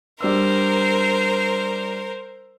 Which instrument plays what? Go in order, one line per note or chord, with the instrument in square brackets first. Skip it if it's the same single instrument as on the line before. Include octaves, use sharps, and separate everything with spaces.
[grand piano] G3 D4 E6 [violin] A#4 C5